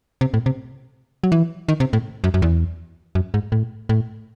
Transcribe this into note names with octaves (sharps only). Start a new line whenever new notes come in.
C3
A2
C3
F#3
E3
D#3
C3
A2
F#2
F#2
E2
F#2
G#2
A2
A2